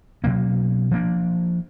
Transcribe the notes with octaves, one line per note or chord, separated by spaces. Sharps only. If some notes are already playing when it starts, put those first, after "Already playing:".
B2 F#3 A#3 C#4
F3 A#3 D4